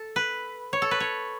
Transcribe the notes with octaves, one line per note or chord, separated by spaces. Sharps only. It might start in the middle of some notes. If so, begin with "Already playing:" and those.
Already playing: A4
B4
C#5
A4
B4
C#5